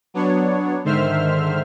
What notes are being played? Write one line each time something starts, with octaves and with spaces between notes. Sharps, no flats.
F#3 B3 D4 C#5
G#2 D3 D#3 C5 E5 F6